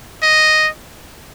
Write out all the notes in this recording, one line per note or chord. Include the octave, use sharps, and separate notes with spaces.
D#5